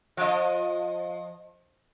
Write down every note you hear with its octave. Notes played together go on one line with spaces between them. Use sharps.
F3 D#5